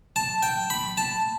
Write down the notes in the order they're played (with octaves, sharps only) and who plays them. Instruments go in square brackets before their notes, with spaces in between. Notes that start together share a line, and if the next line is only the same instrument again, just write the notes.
[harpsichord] A5
G5
B5
A5